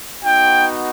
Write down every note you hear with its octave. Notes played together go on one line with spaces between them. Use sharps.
B3 D#4 F#4 G5